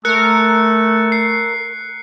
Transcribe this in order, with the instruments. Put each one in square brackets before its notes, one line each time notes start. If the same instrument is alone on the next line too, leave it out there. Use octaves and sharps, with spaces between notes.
[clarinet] A3 [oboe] A4 [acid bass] A#4 [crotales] F#6 C#7
[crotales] C7